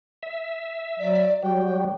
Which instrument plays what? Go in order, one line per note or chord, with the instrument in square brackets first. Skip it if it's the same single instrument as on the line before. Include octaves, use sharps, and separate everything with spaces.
[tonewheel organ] E5
[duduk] F#3 [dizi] D5
[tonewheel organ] F#3 G3 [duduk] F#4 [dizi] G5